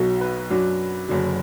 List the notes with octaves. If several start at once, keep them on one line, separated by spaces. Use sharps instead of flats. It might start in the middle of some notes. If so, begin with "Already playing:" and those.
Already playing: B1 B2 F#3 A4
B4
F#2 F#3 D4
F#1 F#2 D3 F#3